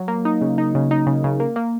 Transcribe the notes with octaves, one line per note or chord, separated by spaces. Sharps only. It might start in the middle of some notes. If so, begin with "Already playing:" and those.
Already playing: F#3
A#3
D#4
C#3
D#4
C#3
D#4
C#3
C#3
A#3
A#3